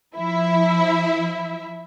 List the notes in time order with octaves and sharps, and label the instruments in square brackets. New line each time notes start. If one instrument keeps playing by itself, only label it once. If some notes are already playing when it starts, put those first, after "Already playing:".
[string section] F3 E4 E5